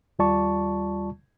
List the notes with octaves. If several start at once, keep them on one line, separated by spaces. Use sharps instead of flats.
D#2 G3 F4 D5 A5 C#6